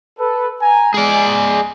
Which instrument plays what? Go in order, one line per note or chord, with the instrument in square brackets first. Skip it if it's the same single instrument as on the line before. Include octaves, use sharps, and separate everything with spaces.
[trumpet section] A4 B4
G#5 A#5
[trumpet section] G#3 [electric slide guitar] G#4 D5